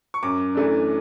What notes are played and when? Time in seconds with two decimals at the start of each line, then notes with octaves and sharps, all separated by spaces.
0.14 C#6
0.23 F#2 D6
0.55 E3 A3 D4